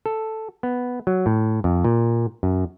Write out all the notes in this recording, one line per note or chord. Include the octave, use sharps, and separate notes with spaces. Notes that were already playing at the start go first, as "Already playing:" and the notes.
A4
B3
F#3
A2
F2
A#2
F#2